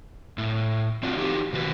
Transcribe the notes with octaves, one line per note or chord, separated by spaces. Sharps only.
A2
C4 D4 F4 F#4
E3 D#4 F#4 G4
B2 D#3 F#4 A4 B4